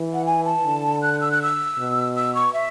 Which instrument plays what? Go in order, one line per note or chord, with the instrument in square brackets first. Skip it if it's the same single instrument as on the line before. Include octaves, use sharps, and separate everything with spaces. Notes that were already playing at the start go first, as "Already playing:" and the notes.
Already playing: [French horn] E3
[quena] F#5
G#5
A5
[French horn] D3
[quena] F#6
E6
F#6
E6
[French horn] B2
[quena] E6
C#6
E5